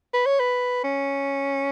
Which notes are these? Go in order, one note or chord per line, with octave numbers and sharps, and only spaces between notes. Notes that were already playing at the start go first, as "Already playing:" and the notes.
B4
C#5
B4
C#4